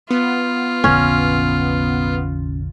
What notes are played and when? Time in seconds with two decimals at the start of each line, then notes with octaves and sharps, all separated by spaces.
0.11 B3 F4
0.84 F1 A#1 D3 C#4